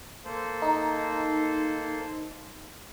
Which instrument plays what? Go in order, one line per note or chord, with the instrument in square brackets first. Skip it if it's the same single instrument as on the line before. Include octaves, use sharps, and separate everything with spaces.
[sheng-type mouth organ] A#3 A4 C5
[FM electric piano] D#4